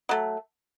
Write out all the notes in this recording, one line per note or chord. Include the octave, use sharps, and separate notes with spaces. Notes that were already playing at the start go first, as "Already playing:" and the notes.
F#3 A3